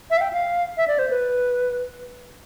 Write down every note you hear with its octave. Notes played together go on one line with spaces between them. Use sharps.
E5
F5
G5
F5
E5
D5
C5
B4